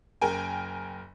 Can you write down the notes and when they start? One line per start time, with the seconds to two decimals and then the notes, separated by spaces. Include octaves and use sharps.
0.21 F#1 A#4 G5 G#5